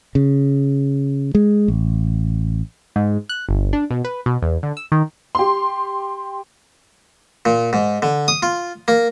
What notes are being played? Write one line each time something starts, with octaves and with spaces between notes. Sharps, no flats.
C#3
G#3
A1
G#2
F#6
G1
D4
B2
B4
B2
E2
D3
E6
D#3
G4 C6
A#2
G#2
D3
D#6
F4
A#3